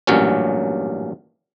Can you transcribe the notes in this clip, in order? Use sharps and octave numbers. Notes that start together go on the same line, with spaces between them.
A1 G2 A#2 F#3 C#4